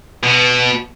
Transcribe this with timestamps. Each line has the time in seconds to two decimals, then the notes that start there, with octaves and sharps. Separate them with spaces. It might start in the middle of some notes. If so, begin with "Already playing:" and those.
0.24 B2